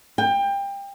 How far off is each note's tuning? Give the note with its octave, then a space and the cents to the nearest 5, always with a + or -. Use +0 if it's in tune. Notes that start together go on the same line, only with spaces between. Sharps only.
G5 +25